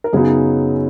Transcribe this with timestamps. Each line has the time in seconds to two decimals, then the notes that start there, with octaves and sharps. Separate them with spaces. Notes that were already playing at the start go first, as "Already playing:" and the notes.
0.04 A#4
0.13 F#2 C#3 F#3 B3 D#4 G#4